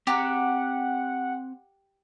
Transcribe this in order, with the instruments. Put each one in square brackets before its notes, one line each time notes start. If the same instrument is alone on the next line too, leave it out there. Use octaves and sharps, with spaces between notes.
[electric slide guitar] C4 A#5 [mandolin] G4 [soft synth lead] F#5